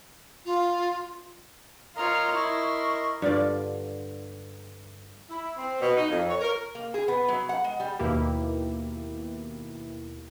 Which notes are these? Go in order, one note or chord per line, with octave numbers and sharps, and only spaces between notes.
F4
F4 A#4 C#5 D#5 A#5 C6
E4 C#6
G2 D3 F4 D5
E4
C4
B2
D#4
F2
C#5
A#4
A#3
G#4
B3
F#3
F#5
G#3
G3
D#2 B2 A#3 E4 G4